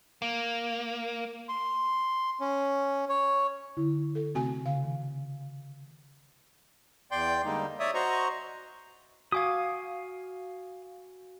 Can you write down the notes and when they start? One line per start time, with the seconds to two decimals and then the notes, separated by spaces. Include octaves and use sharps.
0.22 A#3
1.49 C6
2.40 C#4
3.09 C#5
3.77 D3 E4
4.15 A4
4.35 C3 A3 C4 F#4 G#5
4.66 C#3 F5
4.84 D#3
7.11 E2 D5 G5 C6 G6
7.45 D3 G3 G#3 A#3 D#4
7.80 C#5 D5 E5 D#6
7.94 F#4 C5 D#5 A#5 C#6
9.32 F#4 F5 G#5 D6 D#6 G#6